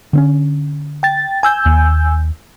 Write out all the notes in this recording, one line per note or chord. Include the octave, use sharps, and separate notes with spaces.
D3 C4 C#4
G5 A6
G#5 E6 G6
D#2